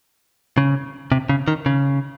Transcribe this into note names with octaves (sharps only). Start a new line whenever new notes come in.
C#3
C3
C#3
D#3
C#3